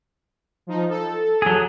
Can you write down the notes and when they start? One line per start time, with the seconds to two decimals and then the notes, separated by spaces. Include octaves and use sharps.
0.67 F3 D#4
0.89 A4
1.42 F#3 G#4